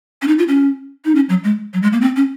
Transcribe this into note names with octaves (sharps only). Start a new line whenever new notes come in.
C#4
D#4
F4
C#4
D#4
C#4
F#3
G#3
F#3
G#3
A#3
C4
C#4